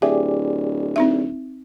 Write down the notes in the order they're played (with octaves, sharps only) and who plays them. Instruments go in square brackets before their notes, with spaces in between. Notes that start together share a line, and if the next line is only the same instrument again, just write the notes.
[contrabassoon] D1 [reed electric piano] G4 G#4 D5 [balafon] E5
[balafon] C4 D#4 E5